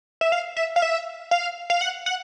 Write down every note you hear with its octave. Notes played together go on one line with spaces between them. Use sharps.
E5
F5
E5
F5
E5
F5
F5
F#5
F#5